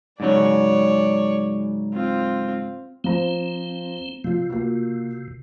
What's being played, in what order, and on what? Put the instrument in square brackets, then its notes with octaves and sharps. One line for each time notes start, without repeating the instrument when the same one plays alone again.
[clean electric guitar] G#2 C#3 F#3 [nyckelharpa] C#5 D5
[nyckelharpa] C4 F4
[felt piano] F3 C5 A#5 [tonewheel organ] C4
[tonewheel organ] C3 [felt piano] F3 F4
[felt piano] A#3 F4 F#4